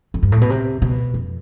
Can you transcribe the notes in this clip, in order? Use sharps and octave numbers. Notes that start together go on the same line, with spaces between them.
F2
G2
A2
B2
C3
B2
F2